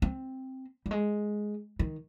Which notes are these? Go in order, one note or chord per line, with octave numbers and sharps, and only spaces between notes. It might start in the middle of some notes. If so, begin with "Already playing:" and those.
C4
G3
G#3
D#3